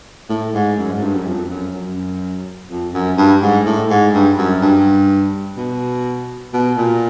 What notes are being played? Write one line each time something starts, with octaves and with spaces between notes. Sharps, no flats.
A2
G#2
F#2
G#2
G2
F#2
F2
F#2
F#2
F2
F#2
G2
G#2
A2
G#2
G2
F#2
G2
B2
B2
A#2